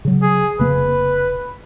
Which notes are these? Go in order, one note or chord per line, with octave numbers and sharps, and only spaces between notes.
C#3 F#3
G#4
F1 C#3 A#3 B4